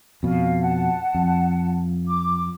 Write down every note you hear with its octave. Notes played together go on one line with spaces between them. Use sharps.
F2 B2 F5
F#5 A5
F2
D6